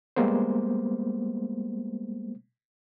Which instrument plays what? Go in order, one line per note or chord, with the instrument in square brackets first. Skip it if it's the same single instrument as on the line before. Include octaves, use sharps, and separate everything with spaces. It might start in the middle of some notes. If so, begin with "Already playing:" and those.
[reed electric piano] G3 G#3 A#3 B3 C5